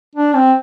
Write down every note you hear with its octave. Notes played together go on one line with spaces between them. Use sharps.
D4
C4